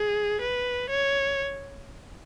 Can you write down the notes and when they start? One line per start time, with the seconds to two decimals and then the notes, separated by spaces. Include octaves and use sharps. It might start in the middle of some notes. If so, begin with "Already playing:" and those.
Already playing: G#4
0.41 B4
0.90 C#5